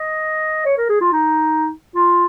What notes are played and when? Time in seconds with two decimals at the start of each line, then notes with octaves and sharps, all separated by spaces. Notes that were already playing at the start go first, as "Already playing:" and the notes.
Already playing: D#5
0.65 C#5
0.77 A#4
0.89 G#4
1.01 F4
1.13 D#4
1.96 F4